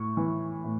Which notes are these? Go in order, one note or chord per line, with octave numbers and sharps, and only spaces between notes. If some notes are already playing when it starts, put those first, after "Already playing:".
Already playing: A2 C#6
E3
A2